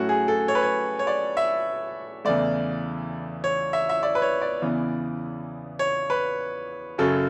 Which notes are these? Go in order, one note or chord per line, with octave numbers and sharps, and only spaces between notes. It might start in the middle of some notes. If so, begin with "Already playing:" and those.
Already playing: A2 F#3 A3 C#4 F#4
G#4
A4
C#5
B4
C#5
C#5
D5
E5
E2 C#3 E3 A3 D5
C#5
E5
E5
D5
B4
C#5
D5
E2 C#3 E3 B3
C#5
B4
F#2 C#3 F#3 C#4 A4